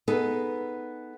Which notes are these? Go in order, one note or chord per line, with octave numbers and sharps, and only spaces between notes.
B3 D#4 G#4 A4 B4